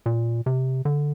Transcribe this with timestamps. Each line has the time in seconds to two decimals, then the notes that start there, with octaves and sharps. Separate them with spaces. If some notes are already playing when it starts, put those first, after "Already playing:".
0.06 A#2
0.46 C3
0.85 D3